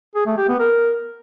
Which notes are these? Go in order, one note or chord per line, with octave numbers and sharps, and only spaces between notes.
G#4
A3
G4
B3
A#4